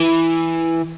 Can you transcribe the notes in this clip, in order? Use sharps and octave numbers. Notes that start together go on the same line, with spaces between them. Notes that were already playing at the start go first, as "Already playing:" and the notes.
Already playing: E3